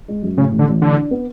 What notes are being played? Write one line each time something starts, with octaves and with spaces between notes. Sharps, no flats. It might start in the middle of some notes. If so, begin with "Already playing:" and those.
G#3
F#2
A2 C#3
A1
D3
A1
D3 D4
D4
B3